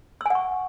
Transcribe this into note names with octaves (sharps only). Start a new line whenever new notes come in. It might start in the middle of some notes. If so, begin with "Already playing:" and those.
F#5 G#5 C#6 E6